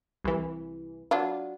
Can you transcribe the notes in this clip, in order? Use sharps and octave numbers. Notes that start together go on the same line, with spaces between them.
C2 E3
F#3 D4 F4